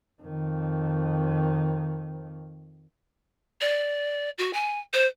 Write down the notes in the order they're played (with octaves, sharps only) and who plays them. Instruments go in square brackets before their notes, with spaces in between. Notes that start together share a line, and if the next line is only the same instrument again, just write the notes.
[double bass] F2 D#3
[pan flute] D5
F#4
G#5
C5